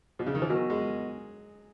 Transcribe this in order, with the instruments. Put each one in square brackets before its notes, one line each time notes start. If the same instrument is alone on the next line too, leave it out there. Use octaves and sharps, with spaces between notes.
[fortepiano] B2
C#3
D#3
E3
[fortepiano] F#3 [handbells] B3 F#4 A#4 D#5 G#5
[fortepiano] G#3